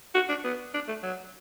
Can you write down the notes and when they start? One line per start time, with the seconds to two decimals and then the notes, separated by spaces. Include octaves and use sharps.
0.15 F#4
0.29 D4
0.44 B3
0.74 D4
0.88 A3
1.03 F#3